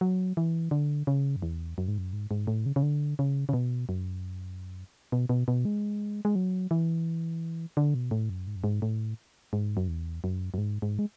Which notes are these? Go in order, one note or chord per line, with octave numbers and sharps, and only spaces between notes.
F#3
E3
D3
C#3
F#2
E2
F#2
G#2
F#2
G#2
G#2
A2
C#3
C#3
D3
C#3
C#3
B2
F#2
B2
B2
B2
G#3
G#3
F#3
E3
D3
B2
A2
F#2
G#2
F#2
G#2
A2
G#2
F#2
E2
F#2
F#2
G#2
G#2
G#3